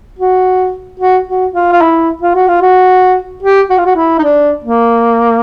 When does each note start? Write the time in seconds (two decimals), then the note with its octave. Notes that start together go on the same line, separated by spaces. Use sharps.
0.19 F#4
0.99 F#4
1.27 F#4
1.53 F4
1.72 F4
1.81 E4
2.22 F4
2.35 F#4
2.48 F4
2.61 F#4
3.43 G4
3.70 F#4
3.78 F4
3.86 F#4
3.96 E4
4.18 D#4
4.24 D4
4.64 A#3